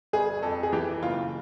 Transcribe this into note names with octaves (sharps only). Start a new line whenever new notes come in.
G1 G#4
F2 A4
G#4
E3 G4
F#1 F4